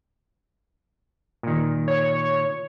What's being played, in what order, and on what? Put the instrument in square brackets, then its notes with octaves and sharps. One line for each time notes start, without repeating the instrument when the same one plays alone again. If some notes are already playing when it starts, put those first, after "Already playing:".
[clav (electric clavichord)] A#2 D#3
[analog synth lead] C#5